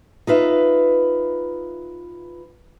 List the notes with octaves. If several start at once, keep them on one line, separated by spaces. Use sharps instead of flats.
D#4 F4 B4 E5